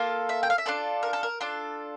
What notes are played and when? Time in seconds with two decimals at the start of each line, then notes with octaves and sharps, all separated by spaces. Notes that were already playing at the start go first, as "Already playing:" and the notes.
Already playing: A#3 F4 A4
0.29 E5
0.43 G5
0.50 F5
0.58 E5
0.66 D4 F4 A4 D5
1.03 A#4
1.13 A4
1.23 A#4
1.41 D4 F4 A4